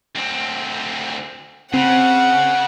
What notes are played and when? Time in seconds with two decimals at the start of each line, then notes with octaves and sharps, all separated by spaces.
0.15 D2 C4
1.74 C#3 C4 F#5